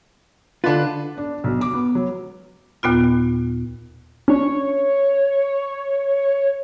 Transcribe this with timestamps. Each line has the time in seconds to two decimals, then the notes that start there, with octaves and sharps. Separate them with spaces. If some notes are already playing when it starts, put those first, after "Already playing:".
0.64 D3 D4 F4 B4
1.18 D4
1.44 B1
1.61 D6
1.74 B3
1.95 F#3
2.83 D#2 A#2 B3 F4
4.28 C#4 D4 C#5